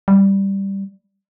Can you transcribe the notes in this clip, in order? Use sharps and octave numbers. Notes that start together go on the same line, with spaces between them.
G3